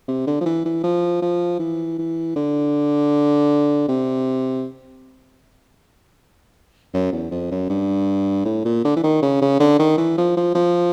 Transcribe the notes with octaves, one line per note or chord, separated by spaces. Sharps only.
C3
D3
F3
E3
E3
F3
F3
E3
E3
D3
C3
F#2
E2
F2
F#2
G2
A2
A#2
D3
E3
D#3
C#3
C#3
D3
D#3
E3
F3
F3
F3